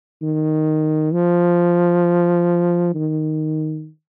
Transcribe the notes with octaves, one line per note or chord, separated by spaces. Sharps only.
D#3
F3
D#3